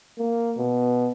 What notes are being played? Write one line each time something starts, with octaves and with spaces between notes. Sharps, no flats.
A#3
B2